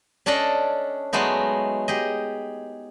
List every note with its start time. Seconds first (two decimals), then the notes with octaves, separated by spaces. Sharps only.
0.26 C#4 D4 A4 D5 D#5
1.13 F#3 G#3 A3 B3 D#4
1.88 G4 G#4 D#5